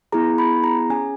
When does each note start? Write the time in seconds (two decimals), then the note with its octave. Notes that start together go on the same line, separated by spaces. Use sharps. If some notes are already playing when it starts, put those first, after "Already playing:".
0.12 B3 E4 G#4 A#5
0.38 B5
0.64 A#5
0.90 C#4 G#4 G#5